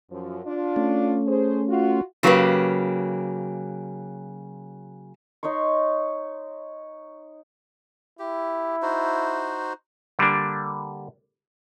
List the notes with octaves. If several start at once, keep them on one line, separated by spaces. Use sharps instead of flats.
F#2 F3
D4 F4 D5
A3 C#4
G#4 C5
F4 F#4
C#3 F#3 A#3 G4 B4
D#4 C#5 C6 C#6
E4 G4
D#4 F#4 C5
D3 G3 A#3 D4